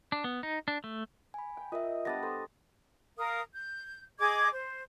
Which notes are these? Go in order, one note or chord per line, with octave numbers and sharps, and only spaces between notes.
D4
B3
D#4
D4
A3
G#5 B5
G5
F4 A#4 D#5 E5
G3 B3 D4 D#6 A6 A#6
A4 C5
A#4 F5 D#6
G6
G#4 D#5 D6 G#6
C5